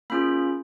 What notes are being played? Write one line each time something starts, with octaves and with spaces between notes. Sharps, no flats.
A#3 C#4 F4 G#4 B5